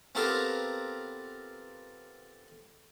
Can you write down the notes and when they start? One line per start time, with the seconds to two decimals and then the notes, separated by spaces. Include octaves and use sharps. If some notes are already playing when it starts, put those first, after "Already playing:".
0.15 B3 C4 F4 G4 A4 A#4